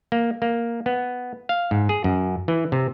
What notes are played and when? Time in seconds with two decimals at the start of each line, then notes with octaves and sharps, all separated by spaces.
0.12 A#3
0.42 A#3
0.86 B3
1.49 F5
1.71 G#2
1.89 G#4
2.04 F#2
2.48 E3
2.72 C3